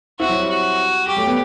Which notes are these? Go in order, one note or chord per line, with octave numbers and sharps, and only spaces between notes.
C4 E4 F#4
F#3
G3
F#4
G3 G4
F#3 A3
G3 B3